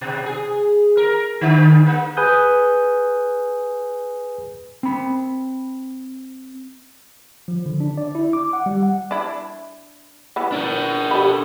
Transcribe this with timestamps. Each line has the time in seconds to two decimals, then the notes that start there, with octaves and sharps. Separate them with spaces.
0.01 B2
0.26 G#4
0.97 A#4
1.41 D3
1.86 A#3
2.17 G#4 B4 G#5 D#6 F#6 G6
4.83 C4 B5
7.48 F3
7.66 D3
7.80 D4
7.98 D5
8.15 E4
8.33 D6
8.53 F#5
8.66 G3
8.83 F#5
9.11 D4 E4
10.36 E3 B3
10.52 D4 A#4
11.11 G4 A4 B5